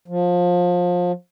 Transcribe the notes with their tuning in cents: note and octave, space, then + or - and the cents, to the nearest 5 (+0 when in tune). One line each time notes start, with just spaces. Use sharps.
F3 +25